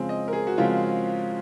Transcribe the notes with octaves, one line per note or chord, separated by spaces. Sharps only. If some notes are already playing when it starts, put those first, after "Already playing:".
Already playing: C#3 F3 G#3 C4
D#5
A#4
G#4
F#4
C#3 F3 G#3 C4 F4